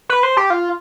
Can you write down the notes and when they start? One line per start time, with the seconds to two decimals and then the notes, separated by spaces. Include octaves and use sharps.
0.09 B4
0.23 C5
0.37 G4
0.50 F4